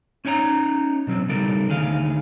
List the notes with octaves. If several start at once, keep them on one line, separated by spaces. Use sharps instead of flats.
C#4 D#4 C#5 G#5 A#5
B2 F#3 A#3 C4
C#3 G3 D#4 A4 A#4
D2 D#3 G#4 B4 F5